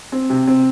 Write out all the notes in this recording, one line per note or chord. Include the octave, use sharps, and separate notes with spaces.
C4
C3
C4